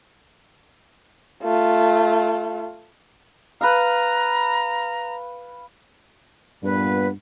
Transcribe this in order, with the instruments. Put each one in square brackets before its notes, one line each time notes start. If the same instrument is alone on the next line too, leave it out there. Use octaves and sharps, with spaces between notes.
[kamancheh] A3 F4
[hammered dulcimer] B4 F5 [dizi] A#5
[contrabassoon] G2 [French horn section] A#2 B3 [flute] B4